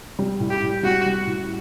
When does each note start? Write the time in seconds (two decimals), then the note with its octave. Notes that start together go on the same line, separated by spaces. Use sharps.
0.19 G3
0.40 A2
0.50 G4
0.62 A2
0.83 G3 F#4
1.06 G3
1.27 A2